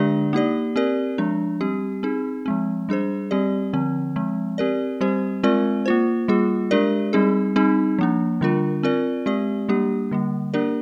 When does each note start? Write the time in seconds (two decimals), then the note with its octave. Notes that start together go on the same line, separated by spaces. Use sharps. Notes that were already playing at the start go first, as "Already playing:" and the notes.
Already playing: D3 G#3 D4 G4 D5
0.33 A#3 D#4 G4 D5
0.76 C4 G4 A#4 D5
1.18 F3 G#3 D4
1.61 G3 C4 G4
2.03 C4 D#4 G#4
2.46 F3 G#3 C4
2.89 G3 D4 G#4 C5
3.31 G3 C4 G4 D5
3.73 D3 F3 C4
4.16 F3 G#3 C4
4.58 C4 G4 A#4 D5
5.01 G3 C4 G4 C5
5.43 G#3 C4 F4 A#4 D5
5.86 A#3 F4 C5
6.28 G3 A#3 F4 G#4
6.71 G#3 D4 G4 A#4 D5
7.13 G3 C4 D#4 G#4
7.56 G3 C4 D#4 G#4
7.99 F3 A#3 D4
8.41 D3 G3 D4 F4 A#4
8.83 C4 F4 A#4 D5
9.26 G#3 C4 G4 D5
9.69 G3 A#3 D4 G4
10.11 D3 G3 A#3
10.54 A#3 D4 G4 A#4 D5